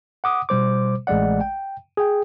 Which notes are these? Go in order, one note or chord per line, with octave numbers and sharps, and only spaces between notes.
F#5 D6 D#6
B2 G3 C5 D6
A1 G#3 A3 D5 F#5
G5
G#4 G5